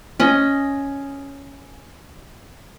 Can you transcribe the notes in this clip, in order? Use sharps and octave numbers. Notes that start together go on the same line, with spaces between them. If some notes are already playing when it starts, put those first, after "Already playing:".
C#4 D#5